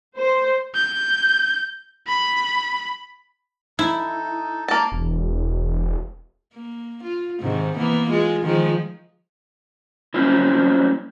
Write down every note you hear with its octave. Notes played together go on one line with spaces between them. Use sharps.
C5
G6
B5
D#4 E4 A4
A#3 A5
E1
A#3
F4
G#2 C3 D#3
E3 A#3 B3
G#3 F4
D#3 F3 G#3
F#3 G3 A#3 C4 C#4 E4